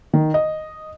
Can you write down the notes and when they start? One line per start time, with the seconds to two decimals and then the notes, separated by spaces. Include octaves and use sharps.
0.13 D#3
0.34 D#5